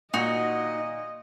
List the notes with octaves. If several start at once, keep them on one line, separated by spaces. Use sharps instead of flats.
A#2 D#4 F#4 D#5